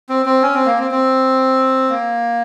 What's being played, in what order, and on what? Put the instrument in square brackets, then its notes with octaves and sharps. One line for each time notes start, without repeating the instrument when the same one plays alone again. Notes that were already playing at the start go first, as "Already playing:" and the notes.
[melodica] C4
C4
C#4
C4
A#3
C4
C4
A#3